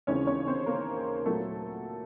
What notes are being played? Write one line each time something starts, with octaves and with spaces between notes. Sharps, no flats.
D#2 C#3 E3 G#3 C4 C#4 C#5
C#4 C#5
C4 C5
A#3 A#4
A#2 F#3 A3 A#3 A4